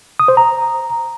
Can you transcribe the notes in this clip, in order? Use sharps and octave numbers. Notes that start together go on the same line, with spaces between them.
D#6
C5
A#5